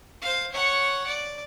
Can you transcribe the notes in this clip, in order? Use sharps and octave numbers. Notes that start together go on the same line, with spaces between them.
C5 F5
C#5 F#5
D5